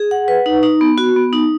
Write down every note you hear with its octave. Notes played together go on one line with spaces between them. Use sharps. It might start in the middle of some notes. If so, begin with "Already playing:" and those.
Already playing: G#4
F#5
B4
D#4
D#4
B3
F#4
B3
D#4